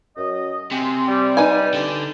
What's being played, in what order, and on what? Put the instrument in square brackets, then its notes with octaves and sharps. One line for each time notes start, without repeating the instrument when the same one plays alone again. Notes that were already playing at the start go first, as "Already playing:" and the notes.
[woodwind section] F#2 D#5
[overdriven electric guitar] C3 [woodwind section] G5 G#5 C6
[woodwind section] G3
[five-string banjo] D#4 B4 G#5
[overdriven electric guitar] D3